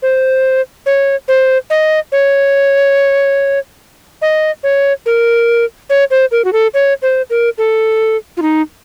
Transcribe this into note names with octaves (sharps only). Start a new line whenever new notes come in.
C5
C#5
C5
D#5
C#5
D#5
C#5
A#4
C#5
C5
A#4
F#4
A4
C#5
C5
A#4
A4
F4
D#4